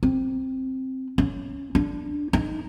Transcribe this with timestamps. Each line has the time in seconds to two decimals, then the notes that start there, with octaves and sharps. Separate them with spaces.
0.03 C4
1.18 C#4
1.75 D4
2.33 D#4